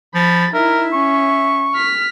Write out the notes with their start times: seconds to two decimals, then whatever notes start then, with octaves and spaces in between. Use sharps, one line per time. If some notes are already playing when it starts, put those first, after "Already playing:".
0.15 F3 B5 A6
0.54 D#4 E4 A#4 E5
0.93 C#4 C#6
1.75 F6 B6